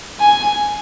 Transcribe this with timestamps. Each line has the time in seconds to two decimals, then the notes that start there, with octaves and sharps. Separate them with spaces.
0.20 G#5